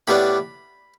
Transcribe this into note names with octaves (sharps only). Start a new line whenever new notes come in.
A2 G3 B3 D4 B5